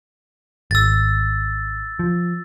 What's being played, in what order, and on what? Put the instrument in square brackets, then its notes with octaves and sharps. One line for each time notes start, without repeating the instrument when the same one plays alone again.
[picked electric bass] G#1 [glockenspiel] E6 A6
[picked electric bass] F3